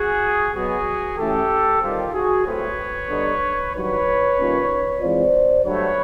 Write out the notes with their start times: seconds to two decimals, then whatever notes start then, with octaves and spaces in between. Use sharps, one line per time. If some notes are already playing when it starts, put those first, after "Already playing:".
Already playing: F#4 G#4
0.54 B2 F#3 B3 F#4 G#4
1.17 A2 E3 A3 C#4 G4 A4
1.82 D#3 G3 C4 F4 G4
2.13 F#4 G#4
2.45 A2 F#3 A3 C4 F4 B4 C#5
3.09 D3 G3 B3 D#4
3.73 G2 D#3 F#3 B4 C#5
4.37 D#3 G3 A#3 C#4 F4
5.01 E3 G#3 C4 F4 C5 D5
5.65 G2 D3 F#3 A3 B4 C#5